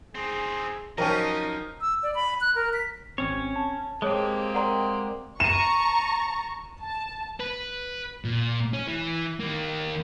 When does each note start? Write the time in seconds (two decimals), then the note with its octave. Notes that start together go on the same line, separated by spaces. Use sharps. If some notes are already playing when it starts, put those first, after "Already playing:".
0.15 C4 D#4 G#4
0.98 F3 F#3 C#4 D#4 A#4 D#5 G5 A5
1.81 E6
2.03 D5
2.15 B5
2.41 F#6
2.55 A#4
2.73 B6
3.18 G#1 C4 C#4 C#5
3.56 A5
4.02 G#3 A#3 C4 G4 G#4 C#5
4.55 A#4 D5 F#5 G5 A#5 C6
5.40 A5 A#5 C#6 D#7 E7
6.81 A5
7.40 B4
8.25 A#2
8.73 C#4
8.88 E3
9.40 D#2 A#3